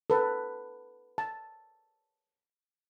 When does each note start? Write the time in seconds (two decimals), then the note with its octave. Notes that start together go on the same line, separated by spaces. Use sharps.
0.10 A4 B4
1.18 A5